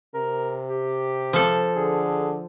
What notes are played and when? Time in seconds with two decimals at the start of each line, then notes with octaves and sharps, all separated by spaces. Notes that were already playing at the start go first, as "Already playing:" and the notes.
0.15 C3 A#4
0.69 G4
1.33 F3 A4
1.76 D3 G#4